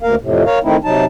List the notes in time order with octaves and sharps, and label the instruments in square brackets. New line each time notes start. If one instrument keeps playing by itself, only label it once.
[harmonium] D2 A#3 A#4 F5
F2 A2 C3
A#4 C#5 F5
D#3 A3 C4 D#4 E4
C3 F#3 D#4 A5